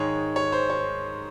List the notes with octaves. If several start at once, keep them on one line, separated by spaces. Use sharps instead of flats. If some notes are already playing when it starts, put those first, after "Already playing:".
Already playing: G#2 D#3 G#3 C#5
C#5
C5
C#5